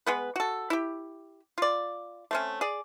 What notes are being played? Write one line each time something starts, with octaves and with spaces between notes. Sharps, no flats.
G#3 B3 B4
F#4 A4
E4 G4
F4 D5
A3 C4 C#4
G#4 D5